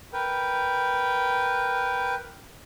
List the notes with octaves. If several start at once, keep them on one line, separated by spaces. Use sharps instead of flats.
A#4 B4 G5